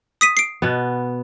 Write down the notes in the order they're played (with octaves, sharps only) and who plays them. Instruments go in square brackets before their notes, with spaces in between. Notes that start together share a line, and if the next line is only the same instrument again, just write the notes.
[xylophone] D#6 B6 D#7
C7 D7
[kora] B2 B3